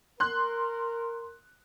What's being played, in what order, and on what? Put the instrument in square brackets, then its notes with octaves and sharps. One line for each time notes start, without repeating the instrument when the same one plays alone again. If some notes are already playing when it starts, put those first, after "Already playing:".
[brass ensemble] A#4 [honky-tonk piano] C6 F#6